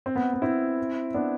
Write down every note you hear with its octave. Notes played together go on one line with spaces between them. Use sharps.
C4
B3
B3
C4 E4
B3 D4